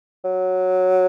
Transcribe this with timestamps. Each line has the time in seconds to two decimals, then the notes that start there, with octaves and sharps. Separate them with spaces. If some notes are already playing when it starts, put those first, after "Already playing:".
0.24 F#3